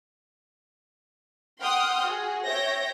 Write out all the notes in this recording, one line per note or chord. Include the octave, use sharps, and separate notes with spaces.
F#5 G5 C6 D#6 F6 G6
F#4 G#4
C#5 E5 G5 G6 A#6